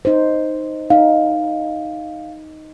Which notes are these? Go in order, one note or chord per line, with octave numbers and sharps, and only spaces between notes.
D#4 C5
D#4 F5